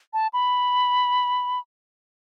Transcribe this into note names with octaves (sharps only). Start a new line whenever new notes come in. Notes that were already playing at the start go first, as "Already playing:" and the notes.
A5
B5